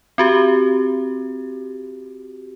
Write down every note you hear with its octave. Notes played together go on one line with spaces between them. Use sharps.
C4 F#4 G4